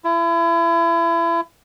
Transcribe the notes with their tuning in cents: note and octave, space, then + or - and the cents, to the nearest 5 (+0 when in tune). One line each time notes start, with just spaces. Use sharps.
E4 +35